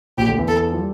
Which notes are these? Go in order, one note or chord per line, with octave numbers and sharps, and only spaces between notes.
A#1 A#2 G4
D2 D3
E2 E3
A4
F3
G3